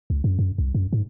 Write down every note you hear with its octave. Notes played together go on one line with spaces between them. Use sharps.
C#2
F#2
F#2
C2
F#2
G#2